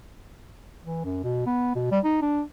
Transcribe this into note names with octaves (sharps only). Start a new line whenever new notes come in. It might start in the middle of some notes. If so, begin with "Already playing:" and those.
E3
F#2
B2
B3
B2
G3
D#4
D4